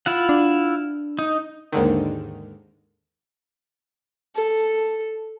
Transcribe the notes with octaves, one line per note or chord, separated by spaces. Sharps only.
E4 F4 F#5
D4
D#4
D#2 G#2 D3 D#3
A4